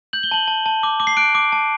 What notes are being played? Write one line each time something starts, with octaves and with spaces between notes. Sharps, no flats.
G6 F#7
G7
A5 F#7
A5
A5
D6
D6
C7
F#6 D7
D6
A5